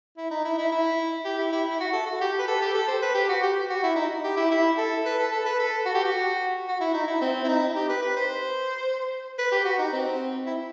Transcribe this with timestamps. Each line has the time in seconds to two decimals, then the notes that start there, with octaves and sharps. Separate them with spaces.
0.17 E4
0.31 D#4
0.45 E4
0.58 E4
0.72 E4
1.25 G4
1.39 E4
1.53 E4
1.69 E4
1.80 F#4
1.93 A4
2.07 F#4
2.21 G4
2.39 B4
2.48 A4
2.62 G4
2.74 A4
2.88 C5
3.02 B4
3.15 G4
3.29 F#4
3.42 G4
3.70 F#4
3.83 E4
3.96 D#4
4.24 G4
4.37 E4
4.51 E4
4.78 A4
5.05 B4
5.19 A4
5.32 A4
5.46 B4
5.59 A4
5.86 F#4
5.95 G4
6.05 F#4
6.68 F#4
6.81 E4
6.94 D#4
7.08 E4
7.21 C4
7.44 E4
7.48 D#4
7.76 G4
7.89 B4
8.02 B4
8.17 C5
9.39 B4
9.52 G4
9.65 F#4
9.79 D#4
9.93 C4
10.46 E4